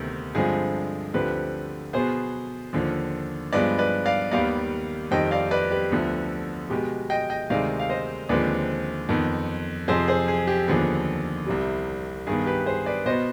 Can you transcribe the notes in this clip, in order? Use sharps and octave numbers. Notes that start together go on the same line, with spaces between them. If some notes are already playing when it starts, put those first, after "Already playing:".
Already playing: D2 C3 D#3 B3
G2 D3 F3 G#3 C4 G#4
D2 D3 F3 C4 G4 B4
B2 B3 G#4 C5
D#2 D3 F3
G2 F3 G#3 B3 B4 D5
B4 D5
D5 F5
D#2 D#3 G3 B3 D5 F5
F2 D#3 G3 C4 D#5 G5
D5 F5
B4 D5
G4 B4
D2 D3 F3 B3
B2 G#3 B3 G4
D#5 G5
D#5 G5
D2 C3 D#3 G#3 D5 F5
F5
C5 D#5
D#2 D3 F3 G#3 C4 B4 D5
F2 D#3 B3
F2 C3 F3 C4 G#4 C5
G#4 C5
G#4
G4
D#2 D3 F3 B3 G#4
C2 C3 G3
G2 D#3 B3 G#4
G4 B4
G#4 C5
B4 D5
B2 B3 C5 D#5